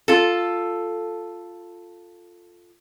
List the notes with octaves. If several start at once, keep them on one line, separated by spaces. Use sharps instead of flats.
F4 A4